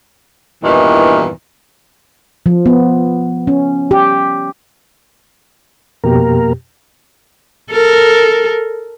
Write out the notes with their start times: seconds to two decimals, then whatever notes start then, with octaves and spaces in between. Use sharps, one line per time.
0.64 E2 G2 A#2 D#3 E3
2.46 F3
2.66 B3
3.47 C#4
3.91 G4
6.04 F2 B2 A#3 G4 A#4
7.71 A4 A#4